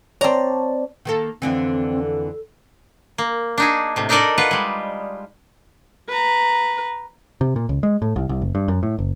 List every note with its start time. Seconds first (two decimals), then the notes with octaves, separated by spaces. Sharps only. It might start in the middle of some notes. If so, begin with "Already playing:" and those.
0.21 C4 C#5 D5 A5 A#5
1.05 D#3 A#3 A4
1.42 F2 D3 E3 C4
2.03 A4
3.18 A#3
3.58 D4 D#4 G#4
3.96 A2 C3
4.09 D4 D#4 A4 A#4 D5 D#5
4.38 F4 B4 F#5
4.51 G3 G#3
6.09 B4 A#5
7.41 C3
7.56 A#2
7.69 C#2
7.83 G#3
8.02 A2
8.16 C2
8.29 C2
8.42 F#1
8.55 G2
8.68 F#2
8.83 A2
8.99 F#1